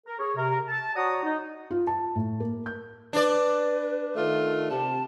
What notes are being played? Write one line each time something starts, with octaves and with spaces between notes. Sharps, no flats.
A#4
G#4 C#5
C3 A#4
A5
F#4 C#5 D5 F#5 A#5 D#6
D#4
F4
A5
A2
A#3
G6
D4 B4 D5
D#3 A3 F4
C3 A5